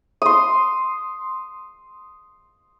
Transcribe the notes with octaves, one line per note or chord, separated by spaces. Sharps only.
C6 D#6